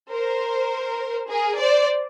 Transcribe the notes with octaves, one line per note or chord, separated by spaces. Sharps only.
A#4 C5
G#4 A#4
C5 D5